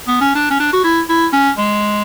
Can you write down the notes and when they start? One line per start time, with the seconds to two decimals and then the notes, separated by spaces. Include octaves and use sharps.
0.08 B3
0.21 C#4
0.35 D4
0.50 C#4
0.60 D4
0.73 F#4
0.84 E4
1.09 E4
1.33 C#4
1.58 G#3